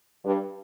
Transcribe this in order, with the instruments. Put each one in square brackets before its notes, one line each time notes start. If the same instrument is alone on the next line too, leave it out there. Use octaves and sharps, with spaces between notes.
[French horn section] G2